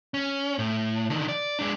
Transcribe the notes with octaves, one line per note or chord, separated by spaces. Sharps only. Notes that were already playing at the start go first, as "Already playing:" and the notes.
C#4
A2
D3 D#3
D5
G#3 D4